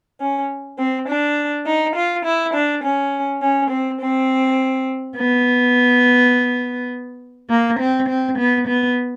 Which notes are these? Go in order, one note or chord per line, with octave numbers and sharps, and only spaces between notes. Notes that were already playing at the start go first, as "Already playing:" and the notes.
C#4
C4
D4
D#4
F4
E4
D4
C#4
C#4
C4
C4
B3
A#3
C4
C4
B3
B3